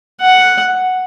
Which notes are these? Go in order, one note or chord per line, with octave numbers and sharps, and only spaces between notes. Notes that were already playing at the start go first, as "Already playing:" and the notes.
F#5